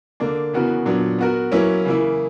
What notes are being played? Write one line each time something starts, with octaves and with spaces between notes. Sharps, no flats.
D3 A#3 D4
C#3 E3 B3 F#4 A#4
A#2 F#3 B3 D4
B3 F#4 A#4
F#3 A#3 C#4 E4 B4
C#3 E3 A#3 E4